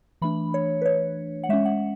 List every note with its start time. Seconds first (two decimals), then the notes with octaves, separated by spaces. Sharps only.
0.22 E3 A3 D4 B5
0.54 C#5
0.82 B4
0.85 C#5
1.44 F#5
1.49 G#3 C#4 E5
1.65 F#5